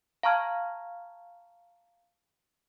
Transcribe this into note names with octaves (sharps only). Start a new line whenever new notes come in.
F5 A5 A#5 C#6 F6 G#6